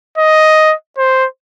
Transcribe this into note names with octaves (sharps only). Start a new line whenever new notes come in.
D#5
C5